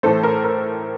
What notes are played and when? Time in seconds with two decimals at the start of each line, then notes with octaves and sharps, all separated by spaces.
0.03 A2 E3 A3 A4 C5
0.23 A#4
0.44 A#4